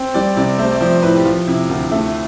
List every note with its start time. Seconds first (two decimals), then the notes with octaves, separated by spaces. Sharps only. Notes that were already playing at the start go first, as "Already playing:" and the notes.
Already playing: C4 G5
0.14 G3 D5
0.37 C3 D5
0.58 A3 C5
0.72 D5
0.81 F3 C5
1.03 A2 B4
1.16 G4
1.25 F3 F4
1.47 C3 E4
1.69 D2 F4
1.91 A3